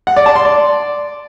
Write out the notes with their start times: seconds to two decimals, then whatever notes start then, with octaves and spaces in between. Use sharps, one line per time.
0.07 F#5
0.16 D5
0.26 A5
0.35 C6
0.45 D5